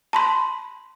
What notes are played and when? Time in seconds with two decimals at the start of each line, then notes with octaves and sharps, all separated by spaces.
0.13 A5 B5 C6